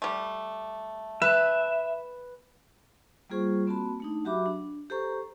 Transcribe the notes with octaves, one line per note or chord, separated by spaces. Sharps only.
G3 A3
B4 E5
G3 A#3 F4 G#4 C5 C#6
A#3 C4 F#4 A5 B5
A3 D4 D#4
F#3 F#4 G4 E5 B5 D6
D4
G4 A4 C5 A#5 C#6